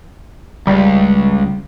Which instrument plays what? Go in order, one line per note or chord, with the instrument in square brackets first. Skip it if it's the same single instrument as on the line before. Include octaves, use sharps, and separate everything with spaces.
[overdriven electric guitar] C#2 [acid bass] G3